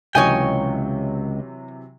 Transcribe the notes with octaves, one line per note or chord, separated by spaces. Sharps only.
C#2 C3 E3 F#3 C#5 D#5 G5 G#5